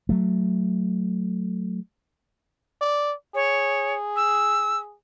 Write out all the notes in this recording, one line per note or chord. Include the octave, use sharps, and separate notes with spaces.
F#3 A3
D5
G#4 C#5
E6